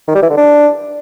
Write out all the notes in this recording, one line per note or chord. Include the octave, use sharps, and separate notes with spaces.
D#3
G3
E3
D3
D4